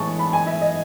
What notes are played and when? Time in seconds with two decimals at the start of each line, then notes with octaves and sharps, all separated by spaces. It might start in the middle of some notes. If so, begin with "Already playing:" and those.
Already playing: A2 E3 G#3 B3 E4 A5 C#6
0.19 B5
0.33 G#5
0.47 E5
0.61 D#5